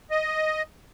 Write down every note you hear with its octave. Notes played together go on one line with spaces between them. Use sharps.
D#5